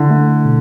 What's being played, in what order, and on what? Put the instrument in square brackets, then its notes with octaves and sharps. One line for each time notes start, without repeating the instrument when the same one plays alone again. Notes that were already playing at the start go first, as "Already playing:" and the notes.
Already playing: [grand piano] D3 [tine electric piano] E4
[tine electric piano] A3
B2